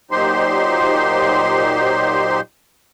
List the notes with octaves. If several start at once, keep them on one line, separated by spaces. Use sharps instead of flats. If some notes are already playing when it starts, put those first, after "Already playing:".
A#2 F#3 D#4 G4 C5 C6